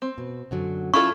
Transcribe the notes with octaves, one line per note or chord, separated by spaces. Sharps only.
C4
B2
F#2 D3 F#3
C#4 E4 F4 A4 D5 C#6